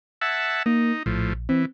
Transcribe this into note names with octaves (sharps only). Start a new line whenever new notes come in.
E5 F#5 A5 E6 G#6
A#3 D#4
A#1 A2 F3
E3 C4